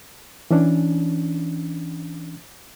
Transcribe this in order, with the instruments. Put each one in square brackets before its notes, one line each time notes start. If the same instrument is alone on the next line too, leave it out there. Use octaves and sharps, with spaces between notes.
[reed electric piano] E3 C#4 D4